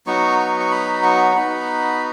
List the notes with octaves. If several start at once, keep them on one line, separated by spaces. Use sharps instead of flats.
F#3 B3 D#4 F#4 C#6
C#6
C#6
B5
C#6
B3 D#4 F#4 B5